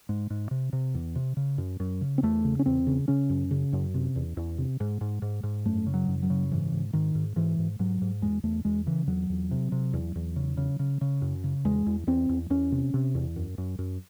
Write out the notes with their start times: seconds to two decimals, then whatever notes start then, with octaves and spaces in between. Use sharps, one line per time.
0.09 G#2
0.30 G#2
0.51 C3
0.73 C3
0.94 E2
1.15 C3
1.37 C#3
1.58 F#2
1.80 F#2
2.01 C#3
2.18 C4
2.23 E2 A3
2.45 C#3
2.59 C#4
2.66 E2 C4
2.87 C#3
3.08 C#3 C#4
3.29 F#2
3.51 C#3
3.73 F#2
3.94 C3
4.16 E2
4.37 E2
4.58 C3
4.80 G#2
5.01 G#2
5.22 G#2
5.43 G#2
5.65 F#2 A3
5.87 C#3
5.94 F#3
6.08 F#2
6.23 F#3
6.30 C#3
6.52 G#2 E3
6.72 G#2
6.93 G#2 D#3
7.15 G#2
7.36 G#2 E3
7.59 G#2
7.79 G#2 F#3
8.02 G#2
8.22 E2 G#3
8.43 E2 A3
8.65 E2 G#3
8.86 C#3 E3
9.07 E2 F#3
9.30 E2
9.51 C3
9.72 C3
9.93 E2
10.15 E2
10.36 C#3
10.57 C#3
10.79 C#3
11.01 C#3
11.22 F#2
11.44 C#3
11.65 E2 G#3
11.86 E2
12.07 E2 C4
12.29 E2
12.50 E2 C#4
12.72 C3
12.94 C3
13.15 E2
13.36 F#2
13.58 F#2
13.79 F#2